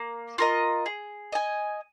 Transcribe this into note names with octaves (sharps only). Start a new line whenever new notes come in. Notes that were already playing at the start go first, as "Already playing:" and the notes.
Already playing: A#3
F4 A#4 D#5
G#4
D#5 G#5